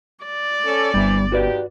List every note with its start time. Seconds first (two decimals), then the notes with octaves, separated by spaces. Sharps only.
0.25 D5
0.65 C#4 A4
0.94 G1 G2 C3 E3 G3
1.32 D#2 F#4 G4 B4 D5